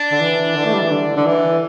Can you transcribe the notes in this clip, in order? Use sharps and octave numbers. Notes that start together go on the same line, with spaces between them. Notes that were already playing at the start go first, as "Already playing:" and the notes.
Already playing: D4
D3
E3
D3
A3
G3
E3
D3
D3
E3